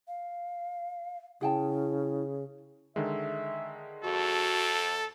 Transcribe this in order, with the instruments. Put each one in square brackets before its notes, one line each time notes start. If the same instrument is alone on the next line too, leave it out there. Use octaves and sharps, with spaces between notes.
[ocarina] F5
[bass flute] C#3 [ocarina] E4 [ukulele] G#4 G5 A5
[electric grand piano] D3 D#3 G#3 [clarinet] E5
[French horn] F2 [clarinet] F#4 [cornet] A4